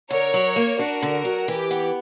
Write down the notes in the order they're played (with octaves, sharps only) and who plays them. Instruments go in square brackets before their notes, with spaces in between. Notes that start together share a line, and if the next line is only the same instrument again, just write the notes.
[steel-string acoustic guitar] D3 [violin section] A#4 C#5
[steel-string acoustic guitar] F#3
A#3
[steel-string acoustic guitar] D4 [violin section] F#4 A#4
[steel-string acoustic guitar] D3
F#3
[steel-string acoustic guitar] E3 [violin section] G4
[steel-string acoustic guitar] B3